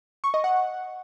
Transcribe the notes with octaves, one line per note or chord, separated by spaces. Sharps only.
C#6
D#5
F#5